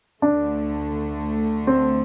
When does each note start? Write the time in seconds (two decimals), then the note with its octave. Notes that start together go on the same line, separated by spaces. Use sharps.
0.22 D2 D3 A3 D4
1.67 C4